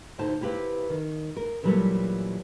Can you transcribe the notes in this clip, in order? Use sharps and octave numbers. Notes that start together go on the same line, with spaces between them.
D2 A2 D#4 C5 A5
C3 E4 G4 B4 F5
D#3
A#4
A#2 D3 E3 F#3 G3 A3